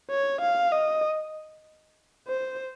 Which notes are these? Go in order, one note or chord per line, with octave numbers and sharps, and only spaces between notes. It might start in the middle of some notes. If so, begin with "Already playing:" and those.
C#5
F5
D#5
C5